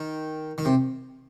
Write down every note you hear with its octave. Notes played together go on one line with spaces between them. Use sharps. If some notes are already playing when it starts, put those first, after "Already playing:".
Already playing: D#3
D#3
C3